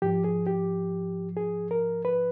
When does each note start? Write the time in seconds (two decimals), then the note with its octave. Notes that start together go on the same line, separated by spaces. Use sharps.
0.02 G#2 F3 G4
0.24 G#4
0.47 G4
1.37 G#4
1.71 A#4
2.05 B4